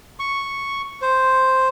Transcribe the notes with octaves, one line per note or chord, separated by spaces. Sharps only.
C#6
C5